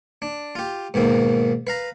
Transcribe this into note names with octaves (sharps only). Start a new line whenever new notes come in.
D4
F4 G4
G#2 B2 D#3 A#3
B4 F5 A#5